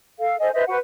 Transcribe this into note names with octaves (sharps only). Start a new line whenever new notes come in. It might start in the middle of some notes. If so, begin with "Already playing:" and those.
A4 F5
A4 C5 D#5 G#5
B4 C5 D#5 E5
F#4 B4 C5 F#5